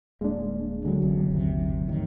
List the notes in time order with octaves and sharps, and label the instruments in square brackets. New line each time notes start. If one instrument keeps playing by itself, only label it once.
[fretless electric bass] D1 A#3 [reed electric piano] G#3 D4
[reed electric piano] D3 F#3 [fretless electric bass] G#3
[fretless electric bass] F#1 C2 C3
G#1 D#2 C3
F2 A2 D#3